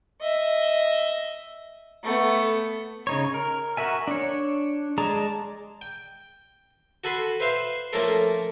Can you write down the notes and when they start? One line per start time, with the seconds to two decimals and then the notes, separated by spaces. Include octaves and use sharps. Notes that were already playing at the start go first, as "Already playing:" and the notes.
0.21 D#5 E5
2.03 A3 B3
3.07 C#3 D#4 C#5
3.34 A#4
3.77 F#4 A#4 E5 G#5
4.07 D4 C#5
4.98 G#3 G#4 D5 A5 A#5
5.81 G5
7.04 F#4 A4 G#5 B5 C6
7.40 B4 C5 E5 F5 C6
7.93 F3 A3 A#3 C#4 A4 A#4